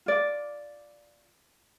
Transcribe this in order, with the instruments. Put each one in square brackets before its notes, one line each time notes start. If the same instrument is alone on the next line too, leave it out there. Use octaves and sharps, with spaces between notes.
[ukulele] F4 D5